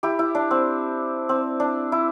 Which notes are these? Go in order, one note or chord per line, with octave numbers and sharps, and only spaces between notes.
E4 G4
E4
D4
C4
C4
D4
E4